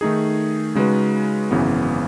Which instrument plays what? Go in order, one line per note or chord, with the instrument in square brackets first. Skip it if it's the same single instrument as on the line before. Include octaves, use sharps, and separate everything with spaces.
[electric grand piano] D#3 A3 D#4 G#4
C#3 G#3 D#4 F#4 B4
G#1 F#2 C#3 E3 B3